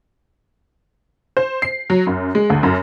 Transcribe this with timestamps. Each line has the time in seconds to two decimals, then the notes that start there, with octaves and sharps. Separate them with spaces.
1.37 C5
1.62 C7
1.90 F#3
2.07 F#2
2.35 G#3
2.50 D2
2.63 F#2